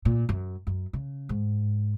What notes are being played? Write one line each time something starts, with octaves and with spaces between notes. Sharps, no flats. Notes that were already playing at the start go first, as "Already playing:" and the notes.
A#2
F#2
F#2
C#3
G#2